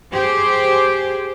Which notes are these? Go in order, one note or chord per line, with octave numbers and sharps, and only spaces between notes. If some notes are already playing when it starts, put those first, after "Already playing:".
G4 G#4 C5